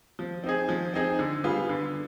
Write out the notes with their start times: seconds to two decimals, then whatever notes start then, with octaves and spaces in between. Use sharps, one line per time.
0.19 F3
0.44 C4 D#4 G#4
0.69 F3
0.94 C4 D#4 G#4
1.19 D3
1.44 G3 B3 F4 G#4
1.69 D3